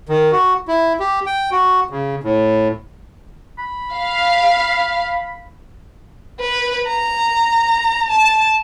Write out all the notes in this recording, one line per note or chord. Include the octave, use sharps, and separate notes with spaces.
D#3
F#4
E4
G4
G5
F#4
C#3
A2
B5
F5
B4
A#5
A5